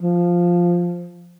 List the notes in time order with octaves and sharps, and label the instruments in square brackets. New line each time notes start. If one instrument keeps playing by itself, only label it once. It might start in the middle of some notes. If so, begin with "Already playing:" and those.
[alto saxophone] F3